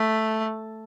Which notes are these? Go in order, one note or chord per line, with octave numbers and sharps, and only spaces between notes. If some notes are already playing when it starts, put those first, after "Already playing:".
Already playing: A3